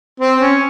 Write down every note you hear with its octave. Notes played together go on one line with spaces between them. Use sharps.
C4
C#4